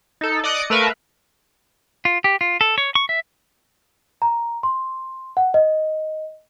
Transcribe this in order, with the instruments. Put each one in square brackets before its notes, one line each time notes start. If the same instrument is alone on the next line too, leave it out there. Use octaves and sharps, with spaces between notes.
[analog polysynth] D#4 A4
D5 D#5 D6 D#6 F#6 C#7
A3 A#4 B4 E5 F5
[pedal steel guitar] F4
G4
F4
A4
C#5
C#6
E5
[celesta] A#5
C6
F#5
D#5